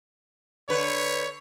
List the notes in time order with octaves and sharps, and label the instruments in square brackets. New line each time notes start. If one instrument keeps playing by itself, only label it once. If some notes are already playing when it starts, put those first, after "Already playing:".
[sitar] D3 B4 [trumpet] C#5